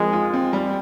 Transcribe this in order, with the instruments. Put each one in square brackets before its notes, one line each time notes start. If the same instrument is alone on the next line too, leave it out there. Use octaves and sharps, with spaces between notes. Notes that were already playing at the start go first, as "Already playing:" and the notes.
Already playing: [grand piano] F3 C4 A#4 [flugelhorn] G#3
[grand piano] F4
C4
G3